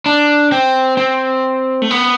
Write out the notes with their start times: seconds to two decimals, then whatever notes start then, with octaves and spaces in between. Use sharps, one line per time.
0.06 D4
0.52 C4
0.97 C4
1.82 A3
1.91 B3